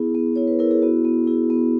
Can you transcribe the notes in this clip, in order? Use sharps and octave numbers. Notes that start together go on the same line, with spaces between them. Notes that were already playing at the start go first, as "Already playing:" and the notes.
Already playing: B3 E4 G#4
B3
E4 C#5
B4
E4 A#4
G#4
B3 F#4
B3
E4 G#4
B3